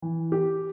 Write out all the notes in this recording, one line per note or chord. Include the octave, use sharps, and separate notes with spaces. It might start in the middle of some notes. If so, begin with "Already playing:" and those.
E3
G4